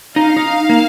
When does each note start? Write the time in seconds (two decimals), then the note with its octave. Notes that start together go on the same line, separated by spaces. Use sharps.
0.16 D#4 F5
0.37 D#4
0.69 A#3